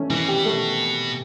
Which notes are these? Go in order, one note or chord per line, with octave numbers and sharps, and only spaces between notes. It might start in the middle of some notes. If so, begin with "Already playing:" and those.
Already playing: E3 A3 C#4
B2 E3
G4
A3